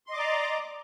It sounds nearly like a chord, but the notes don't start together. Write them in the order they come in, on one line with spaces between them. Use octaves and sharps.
C6 D#5 D6 D5 A#5